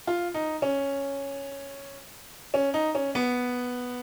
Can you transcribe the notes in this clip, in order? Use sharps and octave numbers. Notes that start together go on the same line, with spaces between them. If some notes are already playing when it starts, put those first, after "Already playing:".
F4
D#4
C#4
C#4
D#4
C#4
B3